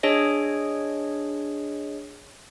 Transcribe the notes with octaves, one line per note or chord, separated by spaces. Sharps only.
D4 G#4 C#5 D#5